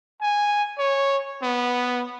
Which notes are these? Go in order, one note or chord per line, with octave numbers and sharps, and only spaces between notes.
G#5
C#5
B3